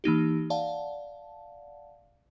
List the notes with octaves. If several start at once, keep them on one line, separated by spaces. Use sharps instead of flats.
E3 A#3 D#4 G4
D5 F5 F#5 A5